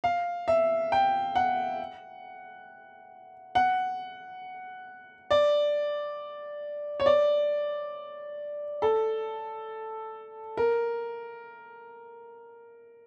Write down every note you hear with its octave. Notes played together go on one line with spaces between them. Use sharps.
F5
E5
G5
F#5
F#5
D5
C#5
D5
A4
A#4